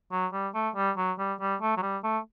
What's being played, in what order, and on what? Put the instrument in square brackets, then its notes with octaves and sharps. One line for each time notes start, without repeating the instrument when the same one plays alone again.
[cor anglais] F#3
G3
A3
G3
F#3
G3
G3
A3
F#3
G3
A3